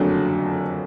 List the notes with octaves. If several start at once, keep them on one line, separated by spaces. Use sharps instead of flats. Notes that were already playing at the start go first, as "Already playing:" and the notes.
Already playing: F#1 F2 D3 F#3 A3